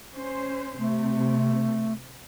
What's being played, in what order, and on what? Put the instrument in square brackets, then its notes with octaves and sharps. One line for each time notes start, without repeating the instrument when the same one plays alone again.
[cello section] C#4 C5
[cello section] C3 [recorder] A3